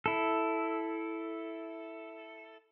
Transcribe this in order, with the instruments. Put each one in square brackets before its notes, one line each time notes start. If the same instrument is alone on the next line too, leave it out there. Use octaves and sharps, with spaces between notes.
[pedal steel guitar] E4 A4